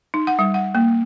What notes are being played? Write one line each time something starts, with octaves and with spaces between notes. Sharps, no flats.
D#4
F#5
G3
F#5
A#3